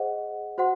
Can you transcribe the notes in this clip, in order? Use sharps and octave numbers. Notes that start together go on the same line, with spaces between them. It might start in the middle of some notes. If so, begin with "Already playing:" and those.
Already playing: G#4 C5 D#5 F#5
F#4 C5 F#5 C6